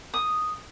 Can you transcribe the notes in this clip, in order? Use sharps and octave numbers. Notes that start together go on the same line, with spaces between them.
D#6